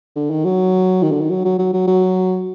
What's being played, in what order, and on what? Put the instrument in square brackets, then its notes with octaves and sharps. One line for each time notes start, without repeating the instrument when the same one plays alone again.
[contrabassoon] D3
D#3
F#3
D#3
D3
D#3
F#3
F#3
F#3
F#3
F#3